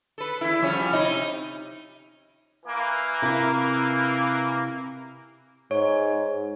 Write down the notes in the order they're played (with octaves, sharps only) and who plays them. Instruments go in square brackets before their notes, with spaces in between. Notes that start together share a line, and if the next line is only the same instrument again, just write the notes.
[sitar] A4 B4
E2 E4
F3 G3 C#4
C3 D#4 E4
[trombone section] E3 A#3
[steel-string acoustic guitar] C3 E4 A#4
[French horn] G#2 [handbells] C#5